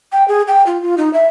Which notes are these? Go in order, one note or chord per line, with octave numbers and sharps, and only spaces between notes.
G5
G#4
G5
F4
F4
D#4
E5